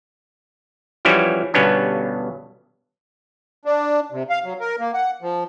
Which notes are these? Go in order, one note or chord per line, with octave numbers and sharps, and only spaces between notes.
E3 F3 G3 C#4 E4 F#4
G1 G2 B2 B3 C#4 D4
D4
C3
F5
F#3
A#4
A#3
F#5
F3